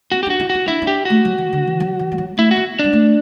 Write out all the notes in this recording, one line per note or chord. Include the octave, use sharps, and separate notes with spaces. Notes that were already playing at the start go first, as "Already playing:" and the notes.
C4 F#4
G4
D4 F#4
E4
E4 F#4
D4 E4
D4
G4
A3 F#4
F#3
E3
D3
E3
F#3
E3
G3
F#3
A3 E4
F#4
B3
G3 D4
A3